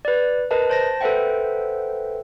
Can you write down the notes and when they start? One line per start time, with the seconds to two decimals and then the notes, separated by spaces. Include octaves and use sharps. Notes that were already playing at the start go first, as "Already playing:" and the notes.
0.05 B4 D5
0.51 A#4 B4 D#5 A5
0.70 C5 A5 A#6
1.01 A4 B4 C5 E5 F#5 G5